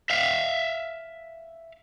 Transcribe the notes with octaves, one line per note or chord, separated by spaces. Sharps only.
E5 F5